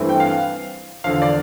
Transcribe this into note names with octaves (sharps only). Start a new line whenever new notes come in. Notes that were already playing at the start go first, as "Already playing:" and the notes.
Already playing: G2 E3 A3 C4
G5
F5
E2 D3 F3 F5
D5